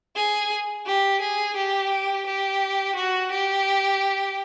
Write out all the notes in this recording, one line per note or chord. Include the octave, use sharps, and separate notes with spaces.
G#4
G4
G#4
G4
G4
F#4
G4